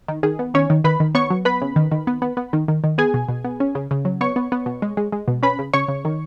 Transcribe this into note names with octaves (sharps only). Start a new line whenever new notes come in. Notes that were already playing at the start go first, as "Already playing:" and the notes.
D#3
D#3 G#4
B3
D#3 C#4 C#5
D#3
D#3 B4 B5
D#3
B3 C#5 C#6
F#3
B3 B4 B5
C#3
D#3
D#3
B3
B3
B3
D#3
D#3
D#3
B3 G#4 G#5
B2
B2
B3
C#4
C#3
C#3
F#3
B3 C#5 C#6
B3
B3
B2
G#3
G#3
G#3
B2
C#4 B4 B5
C#3
C#3 C#5 C#6
C#3
D#3